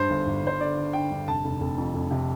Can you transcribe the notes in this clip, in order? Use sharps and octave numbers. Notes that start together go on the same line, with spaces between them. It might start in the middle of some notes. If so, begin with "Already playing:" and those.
Already playing: G2 C5
G1
G1
G2 C5
D3 D5
D3
D3 G5
G2
F1 A5
F1
F1
F2
F1
C3